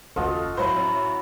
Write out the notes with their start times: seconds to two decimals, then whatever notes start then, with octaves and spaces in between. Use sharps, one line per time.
0.16 F#1 D#2 F4 F#4 A4 D#5
0.57 A2 F#3 E4 C5
0.76 F#2